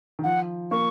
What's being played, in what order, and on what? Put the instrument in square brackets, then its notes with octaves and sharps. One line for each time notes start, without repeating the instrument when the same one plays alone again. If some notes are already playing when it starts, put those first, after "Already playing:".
[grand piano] D#3
[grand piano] F3 [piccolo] F#5
[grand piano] A#3 [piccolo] C#6